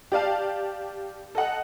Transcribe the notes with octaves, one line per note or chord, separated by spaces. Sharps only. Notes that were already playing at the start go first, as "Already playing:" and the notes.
G4 D5 F5 A5
A4 D#5 F#5